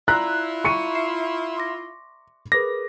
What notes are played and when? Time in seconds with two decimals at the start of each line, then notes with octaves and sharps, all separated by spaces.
0.08 E4 F4 D5 A#5 E6 F#6 B6
0.65 C#6 C#7 D#7
0.95 E5 C7 E7
1.57 C6 D6 A#6
2.52 G#4 A#4 B4 D6 A#6